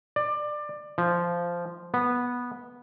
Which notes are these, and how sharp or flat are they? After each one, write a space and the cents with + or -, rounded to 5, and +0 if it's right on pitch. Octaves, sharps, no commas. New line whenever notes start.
D5 +20
F3 -10
B3 -10